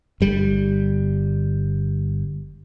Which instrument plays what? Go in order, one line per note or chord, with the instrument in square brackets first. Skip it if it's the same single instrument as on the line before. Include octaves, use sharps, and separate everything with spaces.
[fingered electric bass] G1 G3